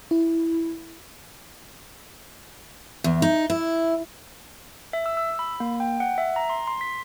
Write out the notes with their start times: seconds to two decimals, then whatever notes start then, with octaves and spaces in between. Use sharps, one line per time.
0.11 E4
3.04 E2
3.22 D#4
3.50 E4
4.93 E5
5.06 E6
5.17 E6
5.39 B5
5.60 A#3
5.80 G5
6.00 F#5
6.18 E5
6.36 A#5
6.50 C6
6.67 C6
6.81 B6